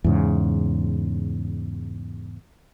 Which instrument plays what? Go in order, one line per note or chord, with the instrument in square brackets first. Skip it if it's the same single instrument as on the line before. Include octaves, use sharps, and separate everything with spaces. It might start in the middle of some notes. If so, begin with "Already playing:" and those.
[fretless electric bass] E2 G#2 C#3